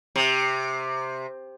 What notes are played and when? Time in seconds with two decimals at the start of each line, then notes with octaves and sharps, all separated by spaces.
0.16 C3